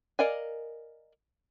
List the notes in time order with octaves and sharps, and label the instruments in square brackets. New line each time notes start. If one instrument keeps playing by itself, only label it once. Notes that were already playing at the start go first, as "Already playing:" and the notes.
[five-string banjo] A#4 D5 D#5 F5 G#5